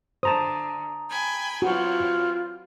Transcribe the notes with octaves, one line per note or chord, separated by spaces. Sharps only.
D3 C5 A5 A#5 D#6
G5 G#5 B5
E3 F#3 C4 F4 F#4